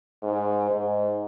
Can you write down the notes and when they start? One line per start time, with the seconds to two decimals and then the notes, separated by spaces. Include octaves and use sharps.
0.23 G#2
0.70 G#2